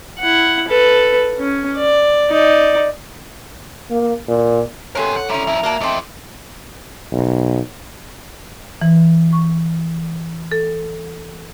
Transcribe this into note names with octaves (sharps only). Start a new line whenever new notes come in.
E4 F#5
A4 B4
C#4
D5
D#4 D5
A#3
A#2
G2 C3 B3 A4 A#4 C#5 G#5
F#5
C3 G3 C#4 E5 A#5
F2 E4 E5
F#3 A#3 D5 A5
E3 A3 C4 D#5 G5
B1
E3
C#6
A4